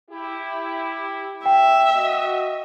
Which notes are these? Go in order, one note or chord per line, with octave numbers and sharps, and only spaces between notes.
E4 G4
E5 G5
F#4 D#5